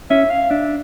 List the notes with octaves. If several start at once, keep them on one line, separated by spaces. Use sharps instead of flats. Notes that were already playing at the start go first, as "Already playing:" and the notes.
C#4 E5
F5
D4 E5